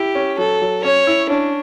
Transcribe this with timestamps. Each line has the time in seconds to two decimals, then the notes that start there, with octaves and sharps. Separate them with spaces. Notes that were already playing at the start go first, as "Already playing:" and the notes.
Already playing: E4 G4
0.15 C#4
0.38 F#3 A4
0.62 F#3
0.84 C#4 C#5
1.07 E4
1.30 C#4 D4